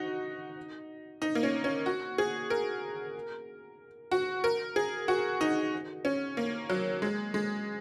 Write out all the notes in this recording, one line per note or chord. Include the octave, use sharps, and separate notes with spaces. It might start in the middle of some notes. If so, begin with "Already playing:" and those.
Already playing: D#4 F#4
D#4
A#3
C#4
C#4
F#4
G#4
A#4
F#4
A#4
G#4
F#4
D#4
C#4
A#3
F#3
G#3
G#3